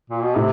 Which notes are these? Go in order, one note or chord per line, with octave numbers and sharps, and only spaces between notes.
A#2
B2
A2 C3